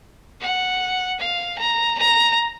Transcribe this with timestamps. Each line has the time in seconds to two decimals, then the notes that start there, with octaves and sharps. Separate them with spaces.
0.41 F#5
1.20 F5
1.59 A#5
1.98 A#5